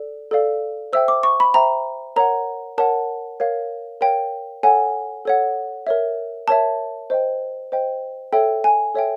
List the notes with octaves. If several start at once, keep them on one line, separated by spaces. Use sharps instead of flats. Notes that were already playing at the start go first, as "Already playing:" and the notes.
Already playing: A4 D5
A4 D5 F5
C5 E5 G5 E6
D6
C#6
B5
C5 E5 G5 A#5
A#4 C#5 F#5 A#5
A#4 C#5 F#5 A5
A#4 C#5 F5
A#4 C#5 F5 G5
A4 C#5 F#5 G#5
A4 C#5 F#5
A#4 C#5 E5
A#4 C#5 E5 A5
C5 D#5 G5
C5 D#5 G5
A4 C#5 E5 G5
G#5
A4 C#5 E5 G5